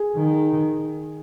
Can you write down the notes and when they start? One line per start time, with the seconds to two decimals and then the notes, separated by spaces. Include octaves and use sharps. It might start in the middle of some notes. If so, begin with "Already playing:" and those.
Already playing: G#4
0.16 D#3